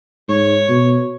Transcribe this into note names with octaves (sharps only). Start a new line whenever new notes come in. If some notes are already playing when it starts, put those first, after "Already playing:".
G#2 C#5
B2